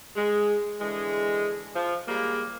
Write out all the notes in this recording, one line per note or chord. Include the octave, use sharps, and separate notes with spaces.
G#3
D3 E3 G#3
F3
G3 G#3 A#3